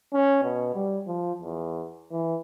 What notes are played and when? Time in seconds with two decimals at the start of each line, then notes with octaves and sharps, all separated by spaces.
0.13 C#4
0.43 B2
0.75 G3
1.07 F3
1.41 E2
2.12 E3